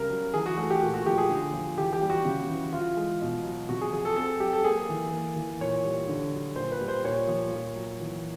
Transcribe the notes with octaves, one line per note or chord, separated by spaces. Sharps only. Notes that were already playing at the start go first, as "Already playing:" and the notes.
Already playing: C#3 G3 A#4
F#3
E3 G#4
F#4
A3 F#4
G4
A#2 F#4
F#4
F3 G4
G#4
D3
F3
E3 G4
G4
G3
F#4
C#3
E3
E3 F4
G#3
B2
F#3
C3 F#4
G#4
F3 G#4
A4
C4 A4
F#3 G4
A4
A#3 G#4
E3
A#3
E3
A#2 C#5
G3
D3
F#3
A#2 C5
B4
G3
C5
A#2 C#5
F3
A#2
F#3
E3